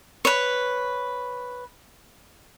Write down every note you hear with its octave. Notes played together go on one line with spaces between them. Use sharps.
B4 C#5